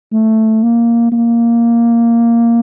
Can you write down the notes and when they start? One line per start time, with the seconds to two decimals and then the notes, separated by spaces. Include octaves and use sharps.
0.13 A3
0.63 A#3
1.12 A#3